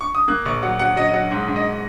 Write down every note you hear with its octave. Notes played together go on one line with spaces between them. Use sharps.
C#6
D#6
A#3 F#6
A#1 C#6
F#3 F#5
F#3 F#5
F#3 D#5
D#5
F#3 F#5
G#2 F#5
G#2
D#5